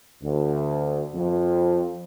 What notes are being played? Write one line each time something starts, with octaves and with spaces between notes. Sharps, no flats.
D2
F2